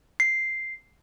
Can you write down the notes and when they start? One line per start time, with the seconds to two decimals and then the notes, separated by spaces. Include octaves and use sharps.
0.20 C7